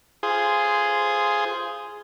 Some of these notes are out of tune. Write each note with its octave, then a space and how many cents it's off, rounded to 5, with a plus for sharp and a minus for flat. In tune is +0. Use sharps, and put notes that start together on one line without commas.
F4 -15 G#4 +0 C5 -5